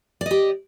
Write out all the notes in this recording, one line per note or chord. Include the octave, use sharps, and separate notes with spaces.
G4 D5 D#5